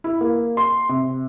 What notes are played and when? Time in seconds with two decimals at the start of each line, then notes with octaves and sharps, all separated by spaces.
0.04 E4
0.21 A#3
0.57 C6
0.89 C3